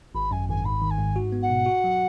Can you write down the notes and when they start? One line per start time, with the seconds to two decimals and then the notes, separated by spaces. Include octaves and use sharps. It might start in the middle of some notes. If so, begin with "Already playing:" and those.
0.14 G#1 B5
0.31 F#2 G#5
0.49 G#1 G#5
0.65 G#2 B5
0.82 D#3
0.90 G#5
0.98 G#2
1.16 F#4
1.32 B3
1.42 F#5
1.50 B2
1.66 F#4
1.84 F#3